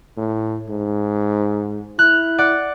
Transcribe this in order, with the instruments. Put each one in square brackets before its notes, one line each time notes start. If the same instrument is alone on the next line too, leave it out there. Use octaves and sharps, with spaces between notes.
[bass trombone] A2
G#2
[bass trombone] E4 [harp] F6 F#6
[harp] D5 F#5 F#6